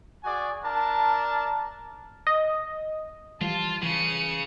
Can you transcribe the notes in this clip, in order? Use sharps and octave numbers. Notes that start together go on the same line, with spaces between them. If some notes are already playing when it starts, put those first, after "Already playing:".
F#4 G#4 D5 G#5
D4 A#4 A5
D#5
E3 F3 G3 F4 A5
C#3 E3 C#7 D#7